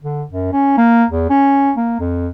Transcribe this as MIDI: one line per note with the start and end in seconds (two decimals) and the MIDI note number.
0.03 0.24 50
0.32 0.49 42
0.53 0.73 61
0.78 1.05 58
1.10 1.30 40
1.30 1.72 61
1.77 1.96 58
2.00 2.28 41